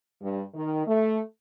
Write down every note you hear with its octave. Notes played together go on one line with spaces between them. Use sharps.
G2
D#3
A3